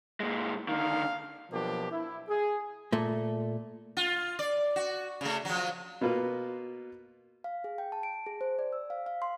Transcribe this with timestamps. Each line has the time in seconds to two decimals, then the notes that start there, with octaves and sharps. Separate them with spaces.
0.20 A#2 G#3
0.68 D3 D#3 F5
1.51 B2 F3 F#3 A#3 D4 G4
1.91 E4
2.28 G#4
2.92 A#2 A3
3.97 F4
4.39 D5
4.76 F#4
5.21 C#3 A3
5.45 F3 F#3
6.01 B2 A#3 F4 B4
7.44 F5
7.64 G#4
7.78 G5
7.92 A5
8.03 D7
8.26 G#4
8.41 C5
8.59 D5
8.73 E6
8.90 F5
9.06 F5
9.22 C6